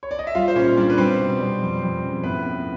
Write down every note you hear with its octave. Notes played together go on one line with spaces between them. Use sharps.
C#5
D5
D#5
E5
G3 F4 F5
C5
A#2 C#4 C#5
G3 D4 D5
B4
G3 C4 C5
B2
G3
F2
F2
C#3
A2 B3 B4
A2